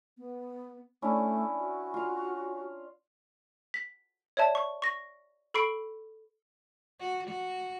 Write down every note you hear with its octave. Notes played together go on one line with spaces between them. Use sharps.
B3
A3 C#4 D4 E4
F#4
F4 F5
B6
C#5 D5 E5 A5
C#6
C#6 A#6
A4 B5 C#6 C7 D7
F#4
F#4